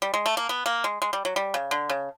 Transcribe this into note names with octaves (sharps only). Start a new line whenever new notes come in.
G3
G#3
A3
A#3
B3
A#3
G#3
G#3
G3
F#3
G3
C#3
D3
C#3